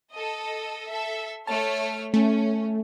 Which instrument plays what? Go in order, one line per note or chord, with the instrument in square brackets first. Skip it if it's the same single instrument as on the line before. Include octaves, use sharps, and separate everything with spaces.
[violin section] A4 D#5
A4 E5
[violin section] A3 C#5 F6 [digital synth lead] A5
[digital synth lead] A3 [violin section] C#4